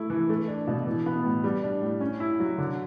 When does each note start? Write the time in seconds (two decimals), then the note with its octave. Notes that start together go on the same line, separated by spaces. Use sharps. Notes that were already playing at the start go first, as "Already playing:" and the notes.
Already playing: A3 E4
0.10 E3
0.29 A3
0.48 D4
0.67 B2
0.87 E3
1.06 B3
1.24 A2
1.44 G3
1.63 D4
1.81 A2
2.01 C#4
2.20 E4
2.40 F#3
2.58 D3